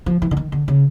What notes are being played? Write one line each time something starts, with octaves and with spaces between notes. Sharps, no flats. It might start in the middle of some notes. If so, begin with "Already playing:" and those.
F3
E3
D3
D#3
D3
C#3